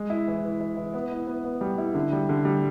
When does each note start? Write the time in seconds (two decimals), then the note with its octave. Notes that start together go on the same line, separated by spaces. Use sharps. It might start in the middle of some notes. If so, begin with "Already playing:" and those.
Already playing: G#3
0.10 E4
0.28 E3
0.44 E3
0.60 E3
0.77 E3
0.94 B3
1.12 E4
1.27 B3
1.45 B3
1.61 G3
1.78 E4
1.94 D3
2.12 G3
2.29 D3
2.45 G3